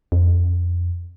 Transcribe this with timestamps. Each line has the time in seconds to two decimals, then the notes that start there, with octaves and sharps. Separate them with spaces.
0.12 F2